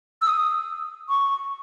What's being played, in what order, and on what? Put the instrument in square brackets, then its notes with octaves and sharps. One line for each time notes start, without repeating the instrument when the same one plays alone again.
[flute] E6
D#6
C#6